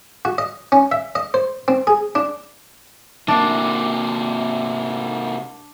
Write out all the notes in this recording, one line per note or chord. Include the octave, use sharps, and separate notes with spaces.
F#4
D#5
C#4
E5
D#5
C5
C4
G#4
D4
C3 A#3 D4